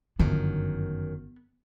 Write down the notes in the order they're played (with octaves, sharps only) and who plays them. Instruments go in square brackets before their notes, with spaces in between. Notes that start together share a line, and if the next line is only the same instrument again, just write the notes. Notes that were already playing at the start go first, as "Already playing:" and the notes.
[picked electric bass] G1 D3 F3 [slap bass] F#2 D#3 [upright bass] B3